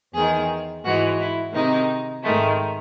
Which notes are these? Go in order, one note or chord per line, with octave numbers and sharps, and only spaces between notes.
E2 D#3 G#3 G#4
G#2 E3 G#3 F#4
E4
C3 D#3 G#3 D#4
G#2 D#3 G#3 A3